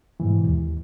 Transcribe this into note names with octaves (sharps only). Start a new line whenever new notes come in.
G#2 B2 E3
D#2